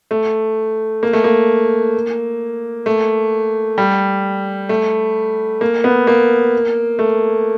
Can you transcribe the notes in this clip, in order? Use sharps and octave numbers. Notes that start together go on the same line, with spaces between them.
A3
A#3
A3
A#3
A3
G3
A3
A#3
B3
A#3
A3